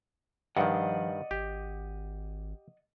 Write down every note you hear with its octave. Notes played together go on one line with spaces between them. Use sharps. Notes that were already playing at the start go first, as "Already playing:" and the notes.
G2 D#3 F3 D5 D#5 F#5
G#1 G4